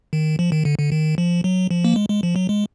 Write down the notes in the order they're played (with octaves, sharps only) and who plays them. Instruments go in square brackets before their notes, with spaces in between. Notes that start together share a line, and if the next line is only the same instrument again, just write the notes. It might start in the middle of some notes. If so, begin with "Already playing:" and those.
[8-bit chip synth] D#3
F3
D#3
D3
D3
D#3
F3
F#3
F3
A#3
G#3
G#3
F3
F#3
G#3